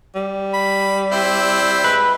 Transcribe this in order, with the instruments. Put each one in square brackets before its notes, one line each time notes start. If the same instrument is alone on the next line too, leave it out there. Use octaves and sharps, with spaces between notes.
[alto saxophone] G3
[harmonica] B5
C4 E4
[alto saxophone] G#3 [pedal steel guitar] B4